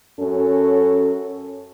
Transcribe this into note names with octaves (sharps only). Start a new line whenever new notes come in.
F#2 C#4 F#4 A4